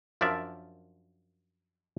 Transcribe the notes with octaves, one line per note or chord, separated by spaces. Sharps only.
F#2 F3 D4 A#4 D5 E5